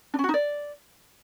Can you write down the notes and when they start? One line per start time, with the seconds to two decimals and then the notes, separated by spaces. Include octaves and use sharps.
0.14 D4
0.19 C#4
0.24 F#4
0.29 D#4
0.34 D5